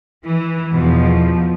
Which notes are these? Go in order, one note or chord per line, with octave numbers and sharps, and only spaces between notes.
E3
E2 B2 F3